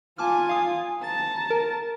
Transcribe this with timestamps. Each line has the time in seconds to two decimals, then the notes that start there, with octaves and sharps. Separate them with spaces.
0.18 F4 G#5 A5 D6 F6
0.49 F5 D#6
1.04 A5 A#5 A6
1.50 A#4